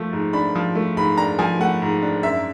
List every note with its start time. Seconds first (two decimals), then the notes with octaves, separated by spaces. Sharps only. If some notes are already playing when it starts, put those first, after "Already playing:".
Already playing: F3 A3
0.13 G#2
0.33 D4 B5
0.55 F3
0.75 A3
0.97 G#2 B5
1.18 D4 A#5
1.39 F3 G#5
1.60 A3 F#5
1.82 G#2
2.03 D4
2.23 F#2 E5